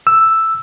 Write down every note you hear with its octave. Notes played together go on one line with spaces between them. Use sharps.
E6